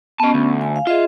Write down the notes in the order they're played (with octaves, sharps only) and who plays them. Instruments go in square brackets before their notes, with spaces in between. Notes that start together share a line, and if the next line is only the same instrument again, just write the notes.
[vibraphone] B3 C#4 [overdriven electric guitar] D#5 A5
[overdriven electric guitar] D2
[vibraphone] G#5
F5
[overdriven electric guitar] F4 [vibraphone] G#4 D#5 E5